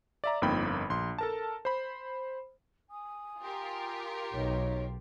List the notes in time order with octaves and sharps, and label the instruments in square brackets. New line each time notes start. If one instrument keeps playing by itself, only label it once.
[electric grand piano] D5 E5 A#5
G1 F2 A#3 D#4 G5 B5
A#1 C6
A4 A#4 A5
C5 B5
[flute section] G#5 D#6
[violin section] F4 G4 A#4
[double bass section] B1 [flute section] D#4 C#5